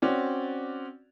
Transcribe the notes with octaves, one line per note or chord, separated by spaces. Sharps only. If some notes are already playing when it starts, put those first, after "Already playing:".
C4 C#4 F#4 D5